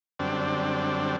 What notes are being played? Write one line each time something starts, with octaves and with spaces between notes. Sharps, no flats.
F#2 D3 G3 C4 D4